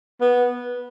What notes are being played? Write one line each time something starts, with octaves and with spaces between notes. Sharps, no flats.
B3